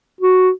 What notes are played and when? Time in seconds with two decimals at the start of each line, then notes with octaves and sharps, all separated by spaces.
0.21 F#4